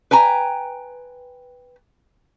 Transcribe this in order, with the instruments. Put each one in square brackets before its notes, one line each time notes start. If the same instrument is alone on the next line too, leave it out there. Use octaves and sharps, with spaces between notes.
[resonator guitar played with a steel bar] B4 G5 G#5 A#5